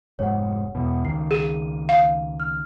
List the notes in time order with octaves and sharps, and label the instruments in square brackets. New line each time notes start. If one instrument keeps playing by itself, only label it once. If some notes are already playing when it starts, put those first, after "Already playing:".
[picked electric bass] F1 G#2 G#3 [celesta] C#5 F#5
[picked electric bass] E2 B2
[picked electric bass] C#2 D#3 [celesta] C7
[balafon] G#4 [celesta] D#7
[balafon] F5
[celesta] F6